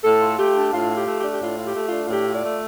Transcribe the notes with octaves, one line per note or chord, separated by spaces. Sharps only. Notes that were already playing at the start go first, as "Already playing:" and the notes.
A2 A4
F4
A3 G4
D4
A2 F4
F4
G4
A3
G4
D4
G4
A2 F4
F4
G4
A3
F4
D4
F4
A2 G4
F4
D5
A3